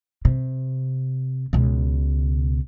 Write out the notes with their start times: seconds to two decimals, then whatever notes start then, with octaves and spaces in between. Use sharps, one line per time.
0.25 C3
1.53 C#2 B2